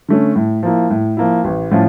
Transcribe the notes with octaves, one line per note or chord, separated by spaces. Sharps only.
D3 A3 C#4
A2
F3 A#3 E4
A2
F3 A#3 E4
A1
A2 F3 C#4 F4